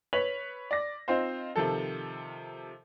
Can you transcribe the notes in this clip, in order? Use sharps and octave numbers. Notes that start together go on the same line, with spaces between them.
B4 C#5 B6 F7 F#7
D5 A#6
C4 D#4 F4 C5
C3 D#3 F3 A4